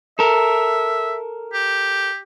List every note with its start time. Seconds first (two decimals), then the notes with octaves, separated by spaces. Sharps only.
0.19 A4 A#4 E5
1.53 G4